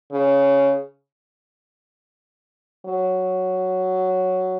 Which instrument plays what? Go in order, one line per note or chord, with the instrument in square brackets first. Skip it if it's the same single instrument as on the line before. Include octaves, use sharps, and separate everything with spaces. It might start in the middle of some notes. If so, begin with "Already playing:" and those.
[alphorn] C#3
F#3